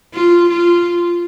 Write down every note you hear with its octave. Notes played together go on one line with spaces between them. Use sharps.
F4
F4